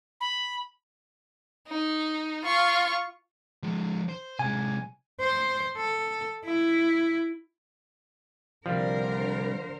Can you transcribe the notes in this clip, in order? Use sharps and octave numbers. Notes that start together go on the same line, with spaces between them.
B5
D#4
F4 C#6
F3 G#3
C5
C3 G#3 G#5
C5
A4
E4
C2 D3 F3 G3 A#4 C5